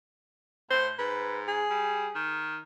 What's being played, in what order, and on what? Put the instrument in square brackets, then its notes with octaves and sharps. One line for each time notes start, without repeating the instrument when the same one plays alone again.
[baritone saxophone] A2 [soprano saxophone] C5
[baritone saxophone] G#2 [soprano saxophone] B4
[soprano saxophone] G#4
[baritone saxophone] G3
D#3